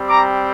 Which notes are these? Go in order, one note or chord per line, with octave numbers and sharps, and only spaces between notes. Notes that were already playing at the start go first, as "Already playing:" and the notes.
Already playing: G3 C4 G4
A#5 D6